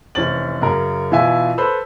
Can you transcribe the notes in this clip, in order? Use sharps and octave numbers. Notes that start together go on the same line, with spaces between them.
F1 E3 C#4 C5 A6 F#7
F#2 C#3 A#4
B2 E3 E4 F4 E5 G#5
A4 B4 C5 B5 E6